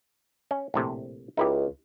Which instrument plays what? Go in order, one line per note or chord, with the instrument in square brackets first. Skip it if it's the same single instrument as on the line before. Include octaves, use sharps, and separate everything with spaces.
[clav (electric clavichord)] C#4
A#1 A2 C3
[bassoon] C#2 [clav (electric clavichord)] D#4 E4 G4